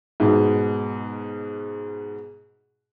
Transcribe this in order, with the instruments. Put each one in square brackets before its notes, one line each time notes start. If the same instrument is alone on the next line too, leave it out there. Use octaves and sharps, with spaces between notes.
[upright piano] G#2 B2